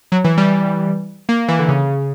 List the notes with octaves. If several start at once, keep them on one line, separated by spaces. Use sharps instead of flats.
F#3
E3
G3
A#3
E3
D3
C#3